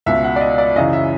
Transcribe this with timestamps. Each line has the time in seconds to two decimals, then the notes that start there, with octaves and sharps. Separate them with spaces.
0.06 C#2 B2 E5
0.24 F#5
0.36 D5
0.41 D#5
0.58 D5
0.76 F#2 C#3 E3 D#5
0.93 E5